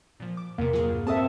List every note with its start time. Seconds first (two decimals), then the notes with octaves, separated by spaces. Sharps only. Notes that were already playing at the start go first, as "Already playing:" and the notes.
0.20 A#2 F3
0.37 D6
0.58 E2 C3 A#3
0.73 A#2 F#3 G#4
0.89 G2
1.07 C4 A4 E5 A5 D#6